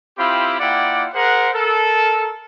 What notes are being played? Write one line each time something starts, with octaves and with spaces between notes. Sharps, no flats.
C4 E4 F4 G4 B5
A#3 E4 F4 D5 F#5 G5
G#4 A#4 C5 F#5
A4 A#4